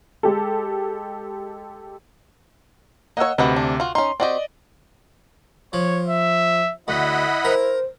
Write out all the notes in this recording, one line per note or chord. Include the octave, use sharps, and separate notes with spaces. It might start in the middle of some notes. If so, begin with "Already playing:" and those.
G#3 G4 A4
A#3 C#5 D#5 F#5 E6
D2 C3 F#4 B4 D#5
D4
F4 F#4
C#4 D#4 C6
C4 F#4 G4 D5 D#5
F3 C#5
E5
D2 E4 D#5 F#5 B5
A#4 C5